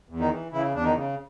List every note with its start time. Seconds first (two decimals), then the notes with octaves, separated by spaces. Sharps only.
0.09 E2
0.20 D#3 D#4
0.31 E3
0.52 C#3 E3 E4
0.73 E2 D4
0.84 D#3 D#4
0.94 C#3